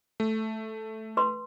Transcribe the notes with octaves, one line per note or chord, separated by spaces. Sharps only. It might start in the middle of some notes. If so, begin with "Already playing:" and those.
A3
B4 C6